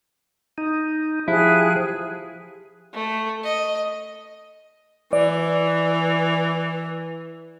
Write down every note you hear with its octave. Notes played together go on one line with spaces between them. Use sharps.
D#4
F3 E4 G4 G#4 F#6
A3
D#5
E3 D5